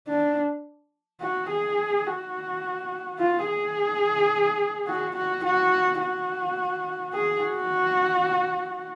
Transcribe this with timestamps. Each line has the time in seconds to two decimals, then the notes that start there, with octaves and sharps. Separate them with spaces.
0.08 D4
1.22 F#4
1.50 G#4
2.07 F#4
3.19 F4
3.47 G#4
4.88 F#4
5.16 F#4
5.45 F#4
6.01 F#4
7.14 G#4
7.42 F#4